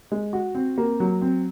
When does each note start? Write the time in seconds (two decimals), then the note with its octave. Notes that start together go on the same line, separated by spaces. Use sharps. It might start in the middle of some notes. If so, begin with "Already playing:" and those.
0.12 G#3
0.33 F#4
0.55 C4
0.78 A#3
1.00 F#3
1.22 C4